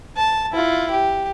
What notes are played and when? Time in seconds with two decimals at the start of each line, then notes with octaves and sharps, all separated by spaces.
0.17 A5
0.52 E4 F4
0.90 G4